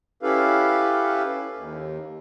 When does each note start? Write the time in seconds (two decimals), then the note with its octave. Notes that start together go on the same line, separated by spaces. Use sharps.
0.23 C#4 E4 G4 A4 B4 F5
1.54 D#2